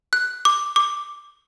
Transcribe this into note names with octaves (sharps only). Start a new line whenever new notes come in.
F#6
D6
D6